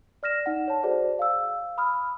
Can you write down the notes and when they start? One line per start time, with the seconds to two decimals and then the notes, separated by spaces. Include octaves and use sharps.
0.23 D5 F6 A#6 E7
0.46 D#4 F#5
0.68 C#5 A5
0.83 F#4 G#4 A4 C5 D5
1.19 F5 E6
1.78 B5 D#6 F6